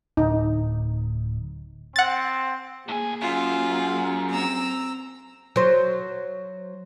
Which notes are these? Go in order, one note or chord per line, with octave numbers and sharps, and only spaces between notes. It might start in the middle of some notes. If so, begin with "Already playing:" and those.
D1 D#4
C4 F#5 A6
A2 A#3 G#4 G#5
F#2 F4
C4 A#5 E6
F#3 C5